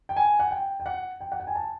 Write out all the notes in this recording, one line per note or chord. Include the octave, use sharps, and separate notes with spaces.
G5
G#5
F#5
G5
G5
F#5
G5
F#5
G5
G#5
A5